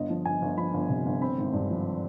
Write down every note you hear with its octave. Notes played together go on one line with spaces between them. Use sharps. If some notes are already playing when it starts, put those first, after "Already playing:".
Already playing: G1 D#5
F3
G1 G#5
G1
F3 B5
G1
C3
G1
C4 B5
G#1
G2
F3